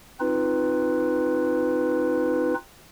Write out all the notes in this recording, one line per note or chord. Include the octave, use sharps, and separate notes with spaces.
C4 D#4 F4 B4